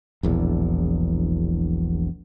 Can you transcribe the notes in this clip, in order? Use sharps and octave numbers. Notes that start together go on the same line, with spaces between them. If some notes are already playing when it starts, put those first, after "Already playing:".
E1 A#1 E2